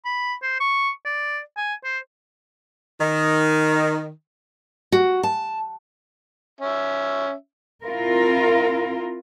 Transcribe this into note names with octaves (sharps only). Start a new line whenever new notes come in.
B5
C5
C#6
D5
G#5
C5
D#3
F#4
A5
C#4 E5
C4 E4 F4 A#4